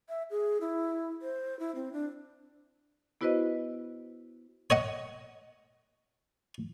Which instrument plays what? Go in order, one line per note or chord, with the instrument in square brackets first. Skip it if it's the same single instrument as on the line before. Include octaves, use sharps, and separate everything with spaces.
[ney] E5
G#4
E4
C5
E4
C4
D4
[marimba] B3 E4 F#4 B4 C5 D#5
[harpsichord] C#5 D#5 F#5